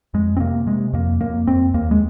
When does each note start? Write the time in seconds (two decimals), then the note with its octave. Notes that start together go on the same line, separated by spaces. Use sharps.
0.14 F2 G#3
0.37 C4
0.40 C3 A#3
0.67 C3 G#3
0.93 F2 A#3
1.21 F2 A#3
1.47 F2 C4
1.74 D#2 A#3
1.91 G#3